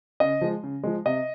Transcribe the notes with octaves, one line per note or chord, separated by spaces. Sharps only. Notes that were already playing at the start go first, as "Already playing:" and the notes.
C#3 D#5
F3 G#3
C#3
F3 G#3
C3 D#5